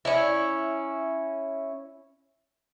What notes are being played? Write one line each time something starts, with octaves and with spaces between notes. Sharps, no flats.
C#4 E4